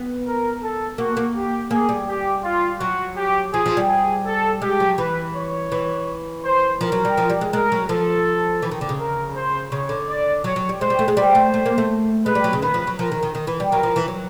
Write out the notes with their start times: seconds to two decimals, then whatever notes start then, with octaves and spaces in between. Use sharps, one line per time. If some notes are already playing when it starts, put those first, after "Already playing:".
Already playing: B3
0.26 A#4
0.63 A4
0.98 A#3 F#4
1.17 A#3
1.35 G4
1.71 A#3 G#4
1.89 G3
2.08 G4
2.44 F4
2.80 F#3 F#4
3.17 G4
3.53 F3 G#4
3.66 F3
3.77 G3
3.89 G#4
4.26 A4
4.62 G#3 G4
4.80 F#3
4.98 E3 B4
5.35 C#5
5.72 E3
6.45 C5
6.80 F3 A#4
6.92 F#3
7.05 G3
7.17 F3
7.30 G3
7.41 G#3
7.53 G#3 A#4
7.72 F#3
7.89 F3 A4
8.62 E3
8.71 D#3
8.81 D3
8.89 C#3
8.99 A#4
9.36 C5
9.71 C#3 C#5
9.89 D3
10.08 D5
10.44 F#3 C#5
10.56 F#3
10.69 G3
10.81 G#3 C5
10.90 G3
10.99 A3
11.08 G#3
11.17 G3 C5
11.35 A3
11.54 A3
11.66 A#3
11.78 A3
12.26 G#3 B4
12.35 G3
12.44 F#3
12.53 C#3
12.62 D#3 B4
12.74 F3
12.87 F#3
12.99 F3 A#4
13.12 D#3
13.23 D#3
13.35 D#3
13.47 E3
13.60 G3
13.71 F#3 A#4
13.83 F3
13.96 E3
14.08 F#3